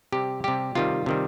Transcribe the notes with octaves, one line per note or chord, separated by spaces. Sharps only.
C3 G3 G4
C3 G3 G4
C3 D#3 G3 F4
C3 D#3 G3